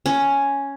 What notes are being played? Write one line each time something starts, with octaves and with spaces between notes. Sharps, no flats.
C#4